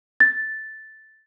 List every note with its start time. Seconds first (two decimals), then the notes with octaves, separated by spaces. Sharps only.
0.20 A6